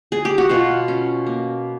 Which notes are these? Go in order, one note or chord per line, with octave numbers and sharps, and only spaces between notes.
G#4
G4
F#4
B2 F4
C#4
A#3